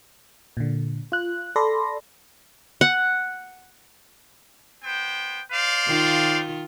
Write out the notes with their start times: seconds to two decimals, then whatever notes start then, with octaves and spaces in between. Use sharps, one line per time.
0.57 A#2 D3
1.12 F4 F#6
1.56 A4 D5 B5 C6 A#6
2.81 F#5
4.83 B3 C5 G5
5.51 C5 D5 F5
5.87 D#3 F4